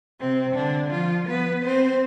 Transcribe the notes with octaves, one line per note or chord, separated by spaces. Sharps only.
C3 C4
D3 D4
F3 F4
B3 B4
C4 C5